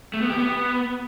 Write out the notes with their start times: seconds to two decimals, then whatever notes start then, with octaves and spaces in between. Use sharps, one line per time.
0.14 A3
0.22 B3
0.30 G4
0.38 B3